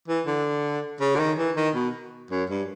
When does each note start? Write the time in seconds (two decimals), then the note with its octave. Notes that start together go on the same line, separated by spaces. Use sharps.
0.08 E3
0.27 D3
1.01 C#3
1.16 D3
1.20 D#3
1.38 E3
1.57 D#3
1.75 B2
2.31 F#2
2.49 G2